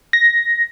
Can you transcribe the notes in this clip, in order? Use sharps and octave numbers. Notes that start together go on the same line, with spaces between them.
A#6